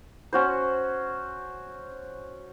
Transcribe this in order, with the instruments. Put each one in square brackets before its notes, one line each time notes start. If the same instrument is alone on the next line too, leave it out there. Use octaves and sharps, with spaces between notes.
[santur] C#4 F#4 C5